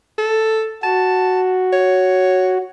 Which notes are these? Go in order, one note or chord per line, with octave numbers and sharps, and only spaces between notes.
A4
F#4 A5
C#5